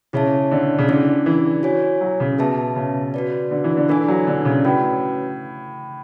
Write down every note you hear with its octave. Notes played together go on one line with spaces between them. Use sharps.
C#3 E4 G#4 C#5 E5 A5
D3
C#3
D3 C#4 E4 G#4 D5
E3
F#4 C#5 G#5
F#3
C#3
B2 G#4 B4 E5 A5
C#3
F#4 B4 D5
D3
E3
D3
E3 D4 A4 D5 G#5
F#3
D3
C#3
A2 C#4 F#4 B4